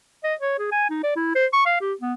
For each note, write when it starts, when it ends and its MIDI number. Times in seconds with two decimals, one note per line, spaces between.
0.24 0.34 75
0.41 0.54 73
0.59 0.70 68
0.72 0.89 80
0.90 1.01 63
1.04 1.12 74
1.16 1.31 64
1.35 1.46 72
1.53 1.65 85
1.66 1.77 77
1.81 1.94 67
2.01 2.14 59